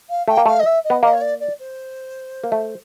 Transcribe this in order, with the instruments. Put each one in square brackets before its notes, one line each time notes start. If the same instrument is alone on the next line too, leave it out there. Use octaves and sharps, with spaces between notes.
[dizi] F5
[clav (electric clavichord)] A3 [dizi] G5
[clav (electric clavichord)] A#3
[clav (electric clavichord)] A3 [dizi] F5
[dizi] D#5
E5
D#5
[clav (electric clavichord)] B3
[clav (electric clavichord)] A#3 [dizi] D#5
[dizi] C#5
D5
D5
C5
[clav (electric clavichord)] A#3
A3